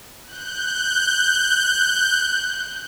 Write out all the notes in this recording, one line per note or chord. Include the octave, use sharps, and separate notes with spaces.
F#6 G6